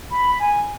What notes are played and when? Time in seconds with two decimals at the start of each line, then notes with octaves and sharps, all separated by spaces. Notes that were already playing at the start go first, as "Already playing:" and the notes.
0.11 B5
0.39 G#5